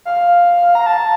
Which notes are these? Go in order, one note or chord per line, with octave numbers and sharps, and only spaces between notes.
F5
A#5
A5